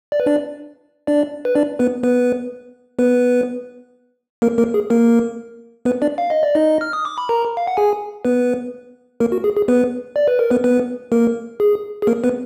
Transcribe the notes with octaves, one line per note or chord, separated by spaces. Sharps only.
D5
B4
D4 D5
D4 D5
B4
D4 D5
B3 B4
B3 B4
B3 B4
A#3 A#4
A#3 A#4
G#4
A#3 A#4
B3 B4
D4 D5
F5
D#5
D5
D#4 D#5
F6
D#6
D6
B5
A#4 A#5
F5
F#5
G#4 G#5
B3 B4
A#3 A#4
F#4
G#4
G#4
B3 B4
D5
B4
A#4
B3 B4
B3 B4
A#3 A#4
G#4
G#4
A#3 A#4
B3 B4